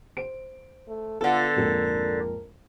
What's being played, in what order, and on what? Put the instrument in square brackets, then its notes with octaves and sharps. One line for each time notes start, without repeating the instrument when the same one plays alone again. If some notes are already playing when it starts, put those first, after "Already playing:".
[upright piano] C5 D7
[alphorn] A3
[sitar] D3 A4 [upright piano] B3 [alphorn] F4
[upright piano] A#1 F2 G#2 [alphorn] A#4